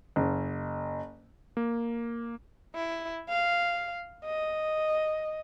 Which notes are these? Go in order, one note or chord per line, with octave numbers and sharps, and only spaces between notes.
F#1
A#3
E4
F5
D#5